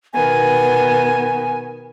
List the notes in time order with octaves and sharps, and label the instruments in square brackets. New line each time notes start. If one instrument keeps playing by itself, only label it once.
[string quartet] B2 D#3 B3 [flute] G#5